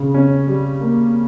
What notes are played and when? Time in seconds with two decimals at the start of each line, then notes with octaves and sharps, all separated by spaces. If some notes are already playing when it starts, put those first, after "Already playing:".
Already playing: C#3
0.14 C#4
0.48 G3
0.81 A#3